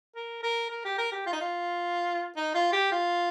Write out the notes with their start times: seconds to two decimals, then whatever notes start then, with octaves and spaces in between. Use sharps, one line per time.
0.16 A#4
0.43 A#4
0.70 A#4
0.85 G4
0.98 A#4
1.12 G4
1.26 F4
1.33 D#4
1.40 F4
2.37 D#4
2.55 F4
2.73 G4
2.92 F4